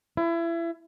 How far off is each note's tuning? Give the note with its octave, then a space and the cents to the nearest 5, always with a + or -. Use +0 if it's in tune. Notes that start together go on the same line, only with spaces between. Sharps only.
E4 +30